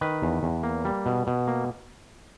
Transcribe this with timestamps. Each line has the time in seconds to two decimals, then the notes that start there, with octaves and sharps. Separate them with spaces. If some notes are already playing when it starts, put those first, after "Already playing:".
0.01 D#3 B4
0.22 E2
0.43 E2
0.63 A#3
0.85 G3
1.06 B2
1.27 B2
1.48 A#3